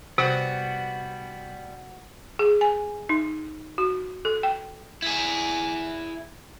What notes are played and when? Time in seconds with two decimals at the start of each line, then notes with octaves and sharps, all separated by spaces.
0.18 C3 G3 B3 F#4
2.39 G#4
2.61 G#5
3.09 D#4
3.78 F#4
4.25 A4
4.43 G5
5.02 E4 G#4